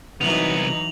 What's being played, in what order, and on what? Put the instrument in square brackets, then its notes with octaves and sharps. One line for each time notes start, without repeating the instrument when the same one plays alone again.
[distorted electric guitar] C2 B3 [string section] E3 F#3 D#4 [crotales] F7 F#7